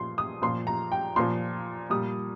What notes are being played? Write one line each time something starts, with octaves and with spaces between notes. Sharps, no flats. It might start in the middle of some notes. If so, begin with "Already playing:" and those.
Already playing: A#2 F3 C6
D#6
A#2 F3 C6
A#5
G5
A#2 F3 C6
A#2 G3 D#6